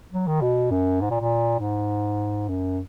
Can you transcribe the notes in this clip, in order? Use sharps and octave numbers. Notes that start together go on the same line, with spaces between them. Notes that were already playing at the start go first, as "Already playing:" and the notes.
F#3
D#3
B2
F#2
G#2
A#2
A#2
G#2
F#2